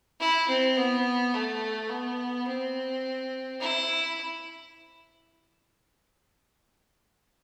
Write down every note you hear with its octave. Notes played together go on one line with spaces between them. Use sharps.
E4
C4
B3
A3
B3
C4
E4